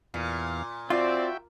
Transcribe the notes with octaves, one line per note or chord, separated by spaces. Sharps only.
E2 A#2 F5
C4 F4 F#4 D5 E5 G5